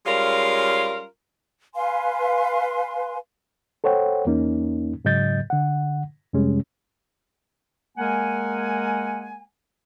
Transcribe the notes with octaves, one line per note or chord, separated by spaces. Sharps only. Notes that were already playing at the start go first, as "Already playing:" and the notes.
G3 G#3 C#4 F4 A#4 F5
B4 F5 G#5 C6
A4 C5 C#5 F#5 G5
E2 A#3 C#4 D#4
G#2 C#3 F#3 D#5 G6 A6
D3 F#5
F2 C3 G3 G#3 C#4
G#3 A#3 A#4 F#5 G#5